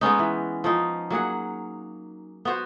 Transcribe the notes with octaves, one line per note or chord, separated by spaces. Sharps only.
G#3 B3 C#4 D#4
E3
F3 C#4 D#4
F#3 A#3 G#4 F#5
B3 F#4 C5